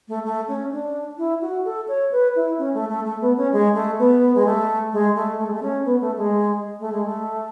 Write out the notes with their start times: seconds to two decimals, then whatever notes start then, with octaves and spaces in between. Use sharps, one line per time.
0.08 A3
0.25 A3
0.48 C#4
0.72 D4
1.18 E4
1.41 F#4
1.65 A4
1.88 C#5
2.12 B4
2.35 E4
2.59 C#4
2.74 A3
2.89 A3
3.05 A3
3.21 B3
3.37 C#4
3.52 G#3
3.75 A3
3.98 B3
4.35 G#3
4.46 A3
4.93 G#3
5.16 A3
5.39 A3
5.47 G#3
5.54 A3
5.62 C#4
5.85 B3
6.01 A3
6.17 G#3
6.80 A3
6.92 G#3
7.05 A3